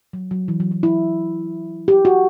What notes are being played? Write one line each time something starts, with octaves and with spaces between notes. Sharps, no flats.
F#3
F#3
E3
F#3
F#3
E4
G4
F#4